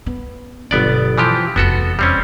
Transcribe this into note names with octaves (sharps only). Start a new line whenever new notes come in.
B3
G1 B2 F#3 B3 D5
E3 F3 G4
F1 E2 B3 F#4 A4
G3 C4 C#4